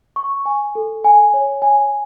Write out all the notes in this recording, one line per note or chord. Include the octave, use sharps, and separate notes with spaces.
C#6
G#5
A4
G#5
C#5
G#5